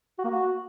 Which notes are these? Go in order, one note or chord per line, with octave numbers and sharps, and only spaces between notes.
F#4
A#3
F#4